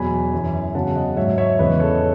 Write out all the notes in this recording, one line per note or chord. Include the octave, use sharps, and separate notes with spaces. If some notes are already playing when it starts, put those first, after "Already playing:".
Already playing: E2 B2 F#3 G#5 B5
F#2 E3
E2 C#3 F#3 F#5 A5
D#5 F#5
G#2 F#3 C#5 E5
C#5 E5
E2 C#3 E3 B4 D#5
A4 C#5